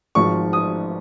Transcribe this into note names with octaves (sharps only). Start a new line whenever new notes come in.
G#1 G#2 F3 C#6
D#6